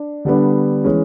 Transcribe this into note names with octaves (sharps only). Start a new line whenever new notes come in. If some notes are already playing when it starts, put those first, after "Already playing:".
Already playing: D4
D3 G3 B3 D4
E3 G#3 C#4